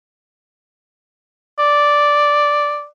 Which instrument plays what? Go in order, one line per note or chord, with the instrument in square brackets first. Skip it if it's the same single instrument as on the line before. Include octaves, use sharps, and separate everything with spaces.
[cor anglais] D5